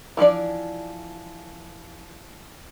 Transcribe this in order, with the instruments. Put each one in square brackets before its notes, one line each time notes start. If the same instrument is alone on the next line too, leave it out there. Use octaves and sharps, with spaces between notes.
[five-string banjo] E3 F3 D4 D5